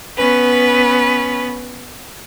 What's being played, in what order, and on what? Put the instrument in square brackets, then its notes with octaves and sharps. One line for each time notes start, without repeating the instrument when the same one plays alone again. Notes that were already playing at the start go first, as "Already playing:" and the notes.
[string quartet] B3 C#4 B4